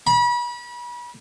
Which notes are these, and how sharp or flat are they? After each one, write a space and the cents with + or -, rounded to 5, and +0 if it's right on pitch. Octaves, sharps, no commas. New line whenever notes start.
B5 -35